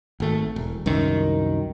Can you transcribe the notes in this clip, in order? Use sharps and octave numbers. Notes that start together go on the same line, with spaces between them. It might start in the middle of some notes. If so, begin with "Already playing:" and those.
G#1 A3
E1
C2 F#2 D#3